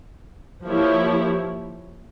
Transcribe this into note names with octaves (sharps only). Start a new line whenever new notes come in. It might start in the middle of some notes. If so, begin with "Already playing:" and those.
F3 A#3 E4 G4 C#5